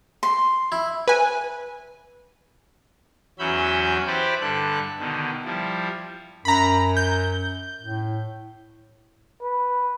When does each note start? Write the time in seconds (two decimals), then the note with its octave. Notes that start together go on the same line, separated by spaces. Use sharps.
0.23 C6
0.72 E4
1.08 B4 G#5
3.39 E2 F#3 C#4 E5 B5 G6
4.07 E4 G4 B4 C5 D5
4.41 G2 D3 A4 F#6
4.99 B2 D3 D#3
5.45 F3 G3 E4
6.45 F#2 A#5 B5
6.97 G6
7.81 A2
9.42 B4